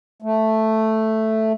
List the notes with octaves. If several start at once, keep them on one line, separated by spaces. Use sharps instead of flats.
A3